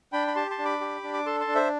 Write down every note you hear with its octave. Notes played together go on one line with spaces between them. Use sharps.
D4 G5 B5
B5
G4 A5 C6
A5 C6
D4
B5 D6
G4
D4
D6
A4 A5 C6
A5 C6
D4
C5 E5